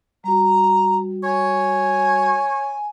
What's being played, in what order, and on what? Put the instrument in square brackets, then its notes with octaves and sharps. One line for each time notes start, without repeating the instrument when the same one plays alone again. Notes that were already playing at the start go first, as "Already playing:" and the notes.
[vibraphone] G3 F#4 [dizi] A#5
[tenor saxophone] C#5 [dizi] G#5